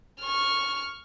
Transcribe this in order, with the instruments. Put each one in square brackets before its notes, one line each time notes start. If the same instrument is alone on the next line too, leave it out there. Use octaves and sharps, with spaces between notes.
[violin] C#6 F6